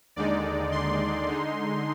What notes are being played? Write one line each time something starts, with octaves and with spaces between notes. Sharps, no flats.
D#2 D3 G#3 D#4 D5
C6
D3 G#3 D#4